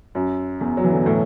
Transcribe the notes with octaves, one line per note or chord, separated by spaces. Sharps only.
F#2
E2
F#3
E3
D3
B2
A2